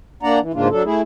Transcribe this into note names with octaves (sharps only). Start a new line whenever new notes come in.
A#3 D4 D5 F#5 A#5
E3
G#2 C#3 A#3 D4 F4
F#3 D4 A4
A3 E4 G#4